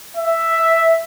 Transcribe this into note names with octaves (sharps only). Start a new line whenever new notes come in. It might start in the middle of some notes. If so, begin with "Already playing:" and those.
E5